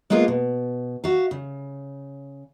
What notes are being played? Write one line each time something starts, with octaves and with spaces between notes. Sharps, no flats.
G#3 A#3 B3 F4 G#4 A#4
B2
F#4 E5 F5
C#3